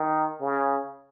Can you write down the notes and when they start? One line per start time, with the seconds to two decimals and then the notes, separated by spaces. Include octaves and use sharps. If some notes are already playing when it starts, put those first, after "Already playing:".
Already playing: D#3
0.41 C#3